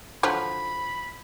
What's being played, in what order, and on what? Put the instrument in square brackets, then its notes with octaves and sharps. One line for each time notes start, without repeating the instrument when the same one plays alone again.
[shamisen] D3 F3 F#3 [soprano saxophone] B5